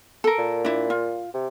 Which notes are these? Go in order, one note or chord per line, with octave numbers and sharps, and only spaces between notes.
A4 A#4
A#2
D4 E4
F4
C3